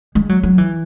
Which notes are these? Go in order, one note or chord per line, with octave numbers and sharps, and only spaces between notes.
G#3
F#3
F#3
E3